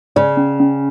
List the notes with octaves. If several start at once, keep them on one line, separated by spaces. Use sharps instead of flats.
C#3 D5
C#4
C#4